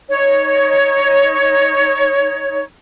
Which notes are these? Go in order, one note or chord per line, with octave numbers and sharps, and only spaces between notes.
D#4 C#5